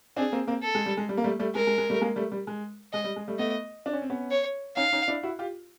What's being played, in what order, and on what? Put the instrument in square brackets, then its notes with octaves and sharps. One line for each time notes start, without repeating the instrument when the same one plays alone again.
[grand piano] C4 D4 [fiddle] G#4
[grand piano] A#3 C4
A#3 C4
[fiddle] A4
[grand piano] G#3
G3
G#3
G3
A#3
G3 A3
G3 A3
[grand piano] G#3 [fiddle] A#4
[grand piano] G#3
G#3
G3 A3
G#3 A#3
G3 A3
G3
G#3
[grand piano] G#3 [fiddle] D#5
[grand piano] G3
G#3
G3 A3
[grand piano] A3 B3 [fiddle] D#5
[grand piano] D4
C#4
C4
B3 C#4
[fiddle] C#5
[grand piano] C#4 D#4 [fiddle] F5
[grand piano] C#4 D#4
D4 E4
E4 F#4
F4 G4